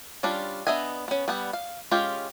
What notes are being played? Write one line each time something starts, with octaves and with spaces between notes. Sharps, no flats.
G3 C#4 D4 F4
B3 D4 D#5 E5 G#5
B3 C#4
G3 B3 F#5
F5
G#3 C#4 F4 G4